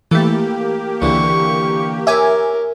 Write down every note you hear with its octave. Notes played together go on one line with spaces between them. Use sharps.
E3 A3 A#3 G4 A4
C#2 D3 E3 C#6
G4 A#4 C#5 E5 G#5